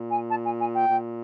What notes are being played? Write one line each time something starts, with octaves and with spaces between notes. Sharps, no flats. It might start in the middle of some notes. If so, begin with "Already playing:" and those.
Already playing: A#2
G#5
A5
G#5
G#5
G5
A#2